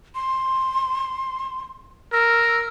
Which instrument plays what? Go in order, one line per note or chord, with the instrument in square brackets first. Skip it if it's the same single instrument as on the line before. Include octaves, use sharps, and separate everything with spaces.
[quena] C6
[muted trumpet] A#4 [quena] E6